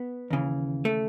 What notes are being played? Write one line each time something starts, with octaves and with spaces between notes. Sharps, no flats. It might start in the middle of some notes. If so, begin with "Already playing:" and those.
Already playing: B3
D#2 C#3 E3
A3